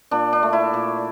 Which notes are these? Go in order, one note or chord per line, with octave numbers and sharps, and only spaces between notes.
A#2 D4
D4
A3
E4
A#2